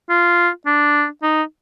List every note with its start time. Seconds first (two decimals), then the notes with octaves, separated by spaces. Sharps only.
0.09 F4
0.66 D4
1.23 D#4